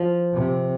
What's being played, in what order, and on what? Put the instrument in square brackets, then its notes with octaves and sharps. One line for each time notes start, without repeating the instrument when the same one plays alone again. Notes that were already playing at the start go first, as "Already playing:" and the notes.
Already playing: [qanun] F3
[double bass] C3